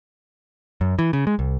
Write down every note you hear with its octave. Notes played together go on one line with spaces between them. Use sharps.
F#2
E3
C#3
G#3
C2